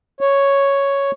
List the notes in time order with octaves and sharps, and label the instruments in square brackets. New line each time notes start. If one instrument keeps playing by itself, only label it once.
[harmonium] C#5